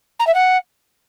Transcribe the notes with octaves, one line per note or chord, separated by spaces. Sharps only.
A#5
E5
F#5